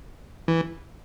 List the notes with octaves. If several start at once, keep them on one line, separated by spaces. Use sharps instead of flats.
E3